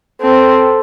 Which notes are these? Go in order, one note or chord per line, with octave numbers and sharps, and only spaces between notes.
C4 A4